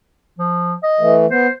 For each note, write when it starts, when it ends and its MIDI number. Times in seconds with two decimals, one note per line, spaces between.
0.38 0.74 53
0.83 1.15 75
1.00 1.26 52
1.00 1.26 57
1.31 1.47 59
1.31 1.53 72